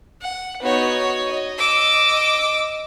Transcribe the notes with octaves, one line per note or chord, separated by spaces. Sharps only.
F#5
B3 D#4 F#4 C#5
D#5
D6 E6